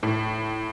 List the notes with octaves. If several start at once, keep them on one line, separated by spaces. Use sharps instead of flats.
A2